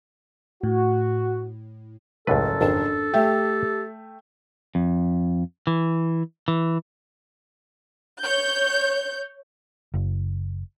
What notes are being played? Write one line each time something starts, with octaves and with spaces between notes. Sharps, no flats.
A2 F#4
F#1 C#2 A2 A4 B4
G#1 F2 D4 A5
A3 G4 E5 G5
F2
E3
E3
C#5 G6
F#1